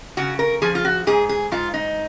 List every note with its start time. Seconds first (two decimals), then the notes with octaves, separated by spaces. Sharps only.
0.17 C#3 F#4
0.39 A#4
0.62 F3 G#4
0.75 F4
0.85 F#4
1.07 G#2 G#4
1.29 G#4
1.52 G#2 F4
1.74 D#4